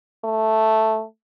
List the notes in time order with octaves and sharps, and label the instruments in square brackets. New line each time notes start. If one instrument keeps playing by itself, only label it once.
[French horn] A3